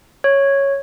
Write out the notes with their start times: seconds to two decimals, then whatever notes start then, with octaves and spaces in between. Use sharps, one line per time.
0.24 C#5